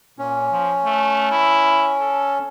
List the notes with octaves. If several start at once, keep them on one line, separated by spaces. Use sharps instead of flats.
A#2 C#4
F3
A3
E4
A4